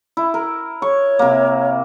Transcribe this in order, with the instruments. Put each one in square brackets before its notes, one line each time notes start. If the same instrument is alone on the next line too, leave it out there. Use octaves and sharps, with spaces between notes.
[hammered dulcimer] E4
A#4
[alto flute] C#5 [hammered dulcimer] C#6
[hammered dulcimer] C3 A#3